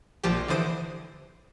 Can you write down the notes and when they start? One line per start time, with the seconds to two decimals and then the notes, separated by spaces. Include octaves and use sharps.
0.24 A#1 A#2 F3 G4
0.48 D3 E3 C5 D#6 D7